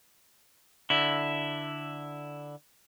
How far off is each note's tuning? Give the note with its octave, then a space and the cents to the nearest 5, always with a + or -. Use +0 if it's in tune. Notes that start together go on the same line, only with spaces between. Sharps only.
D3 +0 E4 +0